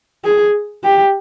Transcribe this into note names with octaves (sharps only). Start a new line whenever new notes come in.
G#4
G4